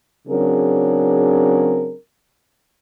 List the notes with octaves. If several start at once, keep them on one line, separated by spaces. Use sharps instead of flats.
C#3 F#3 C4 D4 G#4 A#4